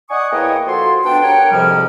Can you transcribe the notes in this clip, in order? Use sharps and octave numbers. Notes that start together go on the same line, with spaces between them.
D5 D#5 F#5 G#5 C#6 D#6
E2 A#3 E4 C#5 D#5 G5
F3 F#4 A4 C6
B3 D4 G5
G4 A#4 C#5 F#5 G5
F2 G#2 C3 F3 G3 F6